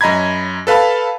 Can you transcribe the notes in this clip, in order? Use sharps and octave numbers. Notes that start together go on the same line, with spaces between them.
F#2 D#5 A#5 B5 G#6
A4 B4 F5 A5 B5